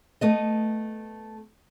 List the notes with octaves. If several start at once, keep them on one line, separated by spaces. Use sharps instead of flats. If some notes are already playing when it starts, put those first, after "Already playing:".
A3 B3 D#5